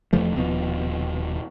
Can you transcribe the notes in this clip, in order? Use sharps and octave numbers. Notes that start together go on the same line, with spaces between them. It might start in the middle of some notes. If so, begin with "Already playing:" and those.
E1 F3 A3
D#1 B2 F3